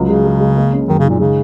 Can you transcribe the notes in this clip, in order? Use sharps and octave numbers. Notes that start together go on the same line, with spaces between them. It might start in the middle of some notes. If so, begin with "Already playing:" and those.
Already playing: C#2 F#3
C#3 G#3
G#3
G#3
A#3
C#4
F#2 D#3
C#3
D#3
A#2
C#3 G#3